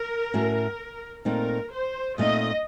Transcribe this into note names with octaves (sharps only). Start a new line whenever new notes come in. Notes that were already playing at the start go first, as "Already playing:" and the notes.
Already playing: A#4
A2 A3 C#4 F#4
A#2 A3 C4 D#4 A#4
C5
A#2 A3 C4 D#4 D#5